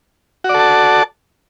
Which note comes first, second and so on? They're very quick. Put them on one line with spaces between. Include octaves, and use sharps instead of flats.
F#4 D5 A4 A5